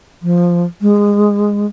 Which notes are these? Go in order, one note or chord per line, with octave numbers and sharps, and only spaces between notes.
F3
G#3